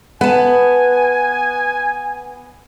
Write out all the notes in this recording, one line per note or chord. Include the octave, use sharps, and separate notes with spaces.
B3 B4 G#5 A5